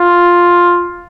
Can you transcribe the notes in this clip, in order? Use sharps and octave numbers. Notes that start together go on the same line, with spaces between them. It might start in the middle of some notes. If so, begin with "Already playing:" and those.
Already playing: F4